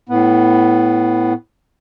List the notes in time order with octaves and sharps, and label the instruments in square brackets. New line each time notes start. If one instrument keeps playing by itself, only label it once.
[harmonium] A2 B3